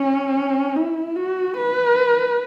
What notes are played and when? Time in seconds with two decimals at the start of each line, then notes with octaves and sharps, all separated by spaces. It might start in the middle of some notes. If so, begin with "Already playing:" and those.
Already playing: C#4
0.76 E4
1.16 F#4
1.57 B4